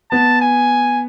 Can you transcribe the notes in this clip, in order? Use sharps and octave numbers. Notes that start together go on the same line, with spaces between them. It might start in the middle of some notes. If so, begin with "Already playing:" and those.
B3 A5
G#5